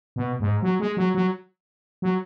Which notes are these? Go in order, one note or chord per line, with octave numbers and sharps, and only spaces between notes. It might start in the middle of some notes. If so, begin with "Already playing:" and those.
B2
G#2
F#3
G#3
F#3
F#3
F#3